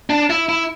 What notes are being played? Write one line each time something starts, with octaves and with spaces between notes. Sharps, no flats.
D4
E4
E4